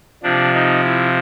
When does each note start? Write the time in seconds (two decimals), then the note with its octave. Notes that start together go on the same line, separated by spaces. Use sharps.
0.23 C3 F3 D4
0.53 D#4
0.83 E4